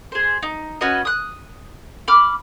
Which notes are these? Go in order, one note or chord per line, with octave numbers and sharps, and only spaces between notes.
G#4 C5
D#4
C#4 F#4 B4 D#5
D#6 F#6
B5 D6 F6